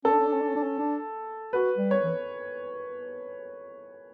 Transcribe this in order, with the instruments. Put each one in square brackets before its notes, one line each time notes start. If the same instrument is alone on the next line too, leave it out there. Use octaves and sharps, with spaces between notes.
[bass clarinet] C#4 [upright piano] A4
[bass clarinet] D4
C#4
D4
C#4
D4
C#4
D4
C#4
D4
[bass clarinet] F#4 [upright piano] B4
[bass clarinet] G3
[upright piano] C#5
[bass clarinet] E3